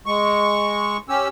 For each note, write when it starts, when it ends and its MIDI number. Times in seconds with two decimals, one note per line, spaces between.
0.06 0.97 56
0.06 0.97 85
1.09 1.28 61
1.09 1.28 67
1.09 1.28 88